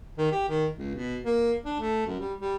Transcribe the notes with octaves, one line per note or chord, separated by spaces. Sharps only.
D#3
G4
D#3
C#2
B2
A#3
D4
A3
F#2
G3
G3